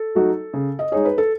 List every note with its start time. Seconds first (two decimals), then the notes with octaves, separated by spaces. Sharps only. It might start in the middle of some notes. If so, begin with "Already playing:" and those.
Already playing: A4
0.15 F#3 A3 D#4 F#4
0.54 C#3
0.79 D#5
0.92 G#3 D#4 G#4 C#5
1.05 B4
1.18 A4